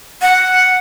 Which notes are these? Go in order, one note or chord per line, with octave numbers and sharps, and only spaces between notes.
F#5